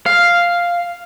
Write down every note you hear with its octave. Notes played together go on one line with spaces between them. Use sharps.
F5